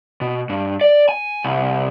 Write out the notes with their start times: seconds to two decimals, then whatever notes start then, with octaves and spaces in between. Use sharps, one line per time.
0.21 B2
0.49 G2
0.81 D5
1.09 G#5
1.45 C2